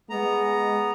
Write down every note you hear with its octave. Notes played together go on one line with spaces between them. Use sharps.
G#3 B3 A#5